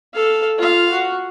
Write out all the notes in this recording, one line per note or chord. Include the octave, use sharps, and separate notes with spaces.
A4 F5
F4 F5
F#4